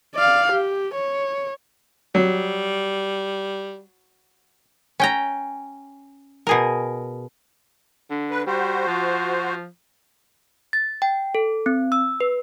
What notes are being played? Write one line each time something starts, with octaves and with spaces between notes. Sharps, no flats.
D5 F5
G4
C#5
F#3 G3
C#4 G5 A#5
B2 G#4 A#4
D3
B4
G3 F#4 C5
F3
A6
G5
A4
C4
E6
B4